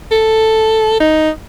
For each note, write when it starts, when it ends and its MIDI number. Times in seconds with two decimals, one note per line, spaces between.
0.11 0.98 69
1.00 1.29 63